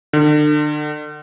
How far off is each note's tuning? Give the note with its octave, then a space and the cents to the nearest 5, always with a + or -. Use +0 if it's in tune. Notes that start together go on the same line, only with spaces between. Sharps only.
D3 +35